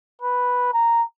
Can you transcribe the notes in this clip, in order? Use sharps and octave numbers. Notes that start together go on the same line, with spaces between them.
B4
A#5